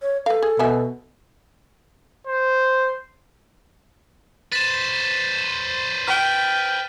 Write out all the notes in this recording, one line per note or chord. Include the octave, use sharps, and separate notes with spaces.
C#5
A4 B4 F5
G#4
B2 B3 E5 G#5
C5
B4 C5 A6 E7
G5 F6 B6 D#7